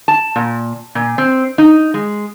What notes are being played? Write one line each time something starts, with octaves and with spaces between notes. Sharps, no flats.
A5
A#2
A#2
C4
D#4
G#3